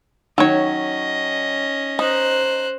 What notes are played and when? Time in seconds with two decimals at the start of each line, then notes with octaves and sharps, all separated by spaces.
0.38 D#3 F#3 C#4 C#5 D#5
1.99 D#4 C5 F#6